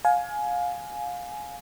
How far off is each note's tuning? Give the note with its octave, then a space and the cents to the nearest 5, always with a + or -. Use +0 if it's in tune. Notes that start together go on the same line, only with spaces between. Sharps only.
F5 +25 G#5 +15